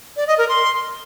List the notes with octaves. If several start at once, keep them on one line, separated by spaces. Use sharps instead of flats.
D5
D#5
A#4
C6